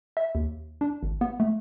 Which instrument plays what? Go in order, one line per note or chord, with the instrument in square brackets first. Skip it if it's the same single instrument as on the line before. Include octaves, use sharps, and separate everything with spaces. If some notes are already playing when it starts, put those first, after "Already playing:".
[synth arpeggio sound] E5
D#2
D4
G#1
B3
A3